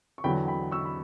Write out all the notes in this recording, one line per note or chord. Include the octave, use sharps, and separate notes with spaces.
C#6
E2 D3 F#3 G5 B5
G5 B5
C#6 E6
B5